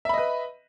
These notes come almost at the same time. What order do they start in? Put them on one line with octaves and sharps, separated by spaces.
E5 B5 D#5 B4